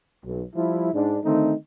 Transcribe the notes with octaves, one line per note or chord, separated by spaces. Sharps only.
B1
F3 G3 E4
G#2 D4
D3 D#3 A3 C4 D#4